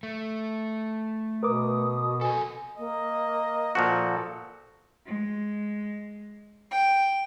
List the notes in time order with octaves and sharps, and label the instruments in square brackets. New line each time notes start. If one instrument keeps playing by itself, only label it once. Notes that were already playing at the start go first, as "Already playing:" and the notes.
[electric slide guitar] A3
[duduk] B2 [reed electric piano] A#4 B4 D6 [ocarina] D#6
[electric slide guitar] C3 A4 [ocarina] G#5
[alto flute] A#3 [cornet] D#5
[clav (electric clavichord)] A#2 F3 F#4 [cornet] A4
[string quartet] G#3
G5